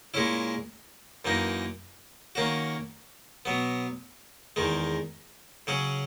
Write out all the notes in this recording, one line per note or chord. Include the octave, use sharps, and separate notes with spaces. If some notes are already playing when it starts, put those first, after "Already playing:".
A#2 G#3 C#4 E4
F#2 E3 A#3 D#4
D#3 A#3 C#4 F#4
B2 F#3 B3
E2 D#3 G#3
C#3 F#3 C#4 G#4